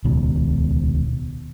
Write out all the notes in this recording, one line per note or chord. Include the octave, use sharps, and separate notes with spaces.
D#1 C#2 B2 D#3